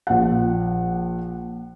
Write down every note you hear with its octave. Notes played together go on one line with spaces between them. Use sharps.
A#1 F#5